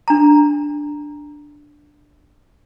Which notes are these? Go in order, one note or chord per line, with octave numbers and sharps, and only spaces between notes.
D4 A#5